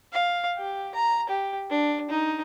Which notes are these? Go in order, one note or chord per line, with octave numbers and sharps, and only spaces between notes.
F5
G4
A#5
G4
D4
D#4